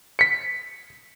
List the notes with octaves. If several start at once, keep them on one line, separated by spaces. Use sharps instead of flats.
B6 C#7